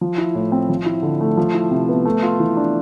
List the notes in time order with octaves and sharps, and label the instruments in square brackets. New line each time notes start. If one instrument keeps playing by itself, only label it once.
[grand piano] F3
E4
A2
C4
F3
E4
D3
A3
F3
E4
C3
B3
A3
F4
E3
D4